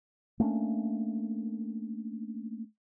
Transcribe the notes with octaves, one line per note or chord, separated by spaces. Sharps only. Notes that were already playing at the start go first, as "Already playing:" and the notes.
A3 A#3 C#4 D4